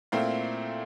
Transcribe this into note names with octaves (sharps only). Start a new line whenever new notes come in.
A#2 A3 C4 E4 F5